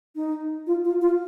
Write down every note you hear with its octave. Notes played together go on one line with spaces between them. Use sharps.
D#4
F4
F4
F4